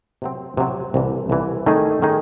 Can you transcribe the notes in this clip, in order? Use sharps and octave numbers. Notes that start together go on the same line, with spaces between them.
C3 F#3 C4
C3 F#3 C4
C2 C3 E3
C2 C3 E3
D#3 A3 D#4 G#4
D#3 A3 D#4 G#4